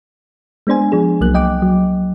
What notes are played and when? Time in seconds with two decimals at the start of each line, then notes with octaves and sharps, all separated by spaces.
0.67 G#3 B3 D4 C5 G#5
0.92 F3 D4 G#4
1.21 C2 F#3 A#3 F#6
1.34 D#5 G5 D6
1.62 F#3